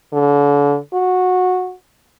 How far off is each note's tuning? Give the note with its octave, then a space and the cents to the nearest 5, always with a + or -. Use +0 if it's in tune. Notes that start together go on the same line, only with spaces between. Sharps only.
D3 -35
F#4 -15